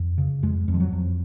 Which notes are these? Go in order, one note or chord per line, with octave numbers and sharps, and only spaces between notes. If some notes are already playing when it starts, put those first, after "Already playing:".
Already playing: F2
C#3
F2 G#3
F2
F3
F#3
F2